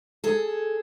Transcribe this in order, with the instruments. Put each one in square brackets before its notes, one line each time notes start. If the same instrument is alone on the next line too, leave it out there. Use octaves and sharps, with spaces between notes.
[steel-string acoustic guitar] G#4 A4